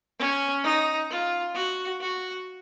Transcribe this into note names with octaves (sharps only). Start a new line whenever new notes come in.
C#4
D#4
F4
F#4
F#4